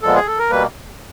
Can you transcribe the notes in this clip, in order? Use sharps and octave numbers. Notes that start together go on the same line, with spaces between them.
A#2 F3 G#3 B3 A4
G#4
A4
A#4
B2 G3 A#3 B4